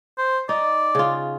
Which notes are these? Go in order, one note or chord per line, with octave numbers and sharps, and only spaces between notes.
C5
D#4 D5
C#3 F4